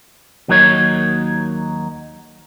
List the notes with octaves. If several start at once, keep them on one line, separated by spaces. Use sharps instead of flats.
D#2 F#3 A#3 D#4 C#5